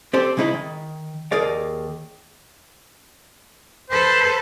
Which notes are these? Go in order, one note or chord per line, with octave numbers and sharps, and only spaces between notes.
C4 G4 A4 C5 D5
C#3 G#3 D#4 E4 A#5 B5
D#3
D#2 G#4 A#4 D5 F5
A4 B4 C5